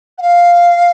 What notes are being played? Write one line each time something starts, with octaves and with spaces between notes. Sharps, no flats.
F#5
F5